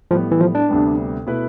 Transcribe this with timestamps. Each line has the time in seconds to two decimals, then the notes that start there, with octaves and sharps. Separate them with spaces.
0.11 A2 F3 G3 B3
0.31 E3
0.40 F3
0.55 D4
0.69 D2 C3 G3 B3
1.27 B2 A3 E4 B4